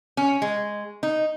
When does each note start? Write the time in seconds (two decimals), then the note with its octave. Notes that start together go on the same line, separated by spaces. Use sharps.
0.17 C#4
0.42 G#3
1.03 D#4